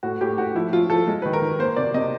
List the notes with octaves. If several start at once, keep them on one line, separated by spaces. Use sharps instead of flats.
A2 F#4
A2 G4
A2 F#4
F3 E4
F3 F4
F3 A4
G#3
D#3 B4
A#4
D#3
A#3 C5
C3 D5
C3 D#5